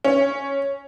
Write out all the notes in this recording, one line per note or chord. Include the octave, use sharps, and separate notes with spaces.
C#4